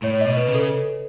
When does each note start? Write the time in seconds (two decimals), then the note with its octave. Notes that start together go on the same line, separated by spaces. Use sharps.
0.03 A2 C#5
0.21 D#5
0.26 B2
0.37 B4
0.48 C#3
0.55 A4